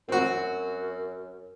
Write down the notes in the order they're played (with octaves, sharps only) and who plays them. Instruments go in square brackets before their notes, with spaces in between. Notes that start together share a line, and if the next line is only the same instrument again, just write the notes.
[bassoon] F#2 [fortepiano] C4 F#4